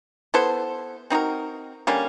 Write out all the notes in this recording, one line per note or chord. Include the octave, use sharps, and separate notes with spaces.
B3 E4 A4 C5
C4 D#4 F#4 A#4
D3 G3 A#3 C#4